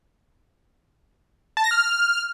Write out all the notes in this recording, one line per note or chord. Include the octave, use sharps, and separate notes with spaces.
A5
A#6
F6